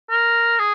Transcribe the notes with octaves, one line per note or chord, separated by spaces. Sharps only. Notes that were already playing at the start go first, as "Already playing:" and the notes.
A#4
G#4